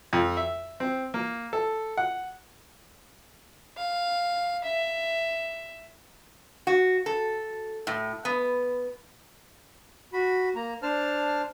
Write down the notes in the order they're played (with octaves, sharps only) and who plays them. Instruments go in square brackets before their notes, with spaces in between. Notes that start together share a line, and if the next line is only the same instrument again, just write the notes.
[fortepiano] F2
E5
C4
A#3
A4
F#5
[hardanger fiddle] F5
E5
[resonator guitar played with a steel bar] F#4
A4
A2
B3
[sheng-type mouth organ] F#4 B5
A#3 A#5
D4 C5 A5 F6